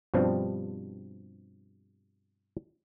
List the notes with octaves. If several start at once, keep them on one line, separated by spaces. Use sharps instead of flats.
G2 B2 F3 G3 C4 D4